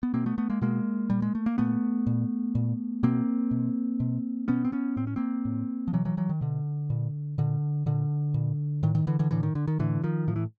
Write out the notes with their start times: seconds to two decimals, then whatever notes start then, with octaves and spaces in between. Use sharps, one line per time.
0.03 B3
0.14 B2 A#3 C4
0.26 A3 B3
0.38 A3 B3
0.50 G#3 A#3
0.62 B2 G#3 A#3
1.10 A#2 G3
1.22 G#3
1.35 A3
1.46 A#3
1.58 A#2 A3 B3
2.07 A#2
2.55 A#2
3.03 B2 A#3 C4
3.51 B2
4.00 B2
4.48 B2 B3 C#4
4.65 C4
4.72 B3 C#4
4.96 A2 C4
5.07 C#4
5.16 A#3 C4
5.45 A2
5.88 F3
5.93 B2 E3 F#3
6.05 E3 F#3
6.17 E3 F#3
6.29 D#3
6.41 B2 D3
6.90 A#2
7.38 A#2 D3
7.86 A#2 D3
8.34 A#2
8.83 A2 D#3
8.95 D#3
9.07 D3 E3
9.19 D3 E3
9.31 A2 D3 E3
9.43 D#3
9.55 D3
9.67 D#3
9.79 A2 D3 E3
10.04 D#3 F3
10.28 A2 F3
10.36 E3